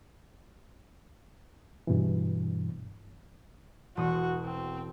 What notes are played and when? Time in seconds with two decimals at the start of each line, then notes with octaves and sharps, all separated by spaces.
1.87 G2 B2 E3
3.97 E1 F#4 C6 D#6
4.44 C4